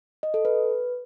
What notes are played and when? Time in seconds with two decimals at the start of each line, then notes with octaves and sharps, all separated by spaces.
0.23 D#5
0.34 A4
0.45 B4